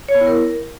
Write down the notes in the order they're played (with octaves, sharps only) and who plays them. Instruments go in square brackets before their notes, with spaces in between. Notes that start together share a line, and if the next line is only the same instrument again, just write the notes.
[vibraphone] C#5
B3
E4
A#4